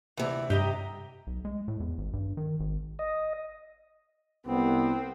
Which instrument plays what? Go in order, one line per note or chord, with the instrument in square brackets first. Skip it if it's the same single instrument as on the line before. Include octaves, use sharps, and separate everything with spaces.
[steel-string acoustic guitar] D2 C3 [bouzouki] E3
[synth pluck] G2 [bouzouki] G4 D#5 A#5
[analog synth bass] B1
G#3
A2
E2
G#1
G2
D#3
G#1
[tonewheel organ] D#5
[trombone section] C2 B3 [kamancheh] C4